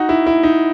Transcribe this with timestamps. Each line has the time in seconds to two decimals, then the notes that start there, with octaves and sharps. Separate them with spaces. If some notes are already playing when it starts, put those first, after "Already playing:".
Already playing: D#4 F#4
0.09 E4
0.27 E4
0.43 D#4